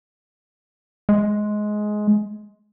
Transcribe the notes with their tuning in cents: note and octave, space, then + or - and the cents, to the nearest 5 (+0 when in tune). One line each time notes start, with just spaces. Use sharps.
G#3 +15